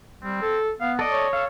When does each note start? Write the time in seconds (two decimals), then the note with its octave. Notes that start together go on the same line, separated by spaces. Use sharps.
0.23 G3 C4
0.42 A4
0.80 B3 F5
0.99 A4 D5 D#5
1.11 C#5
1.33 A4 F5